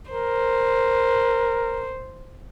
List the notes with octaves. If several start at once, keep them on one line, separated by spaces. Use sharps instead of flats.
A#4 C5